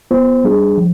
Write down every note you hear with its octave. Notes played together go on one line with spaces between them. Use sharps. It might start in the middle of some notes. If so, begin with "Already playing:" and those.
B3 F4 C5
G3 D4 G#4
F3